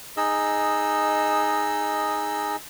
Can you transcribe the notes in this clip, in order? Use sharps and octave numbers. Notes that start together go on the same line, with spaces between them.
D#4 G#4 D#5 E6